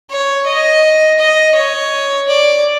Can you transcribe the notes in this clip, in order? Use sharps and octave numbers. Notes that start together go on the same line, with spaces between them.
C#5
D#5
D#5
C#5
D5